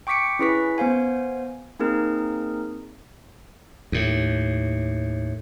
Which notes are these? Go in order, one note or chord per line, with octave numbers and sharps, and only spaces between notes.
G5 C#6 D6 B6 C#7 D7
C#4 E4 G#4 B4 C#6 B6
B3 C5 F5 G#5
A#3 C4 D#4 G#4 A#4
D#2 A2